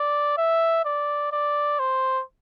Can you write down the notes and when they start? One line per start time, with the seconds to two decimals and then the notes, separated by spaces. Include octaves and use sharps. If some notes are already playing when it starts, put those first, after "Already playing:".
Already playing: D5
0.38 E5
0.85 D5
1.32 D5
1.79 C5